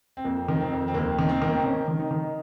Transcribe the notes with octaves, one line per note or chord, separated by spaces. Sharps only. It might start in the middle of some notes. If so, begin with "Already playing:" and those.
C4
F2 A#3
D#3
C4
F2
C4
D#2 A#3
D#3
C4
D#3
A#3
C4
D#3 C#4
D#3
D#4
D#3